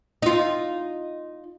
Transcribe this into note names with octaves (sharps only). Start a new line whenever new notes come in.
D#4 F4